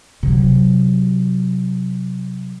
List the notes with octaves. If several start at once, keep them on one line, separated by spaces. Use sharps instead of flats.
C3 F#3